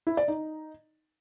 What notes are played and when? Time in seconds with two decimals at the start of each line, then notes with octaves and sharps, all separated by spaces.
0.07 E4
0.17 D5
0.28 D#4